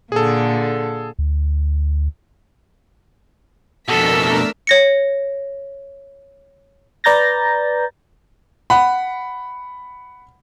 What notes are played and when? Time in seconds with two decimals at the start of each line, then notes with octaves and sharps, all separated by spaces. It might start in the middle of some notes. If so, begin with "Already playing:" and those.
0.12 A#2 D3 G#4 A4
1.19 D2
3.88 F2 B2 A3 D4 A4 A#4 E6 B6
4.67 C#5 A#6 C#7
7.04 B4 D5 A#5 G6 A6 A#6
8.70 F#5 B5